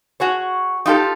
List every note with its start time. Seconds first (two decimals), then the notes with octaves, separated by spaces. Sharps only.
0.20 F#4 G#4 C#5
0.86 D#4 F4 G4 A4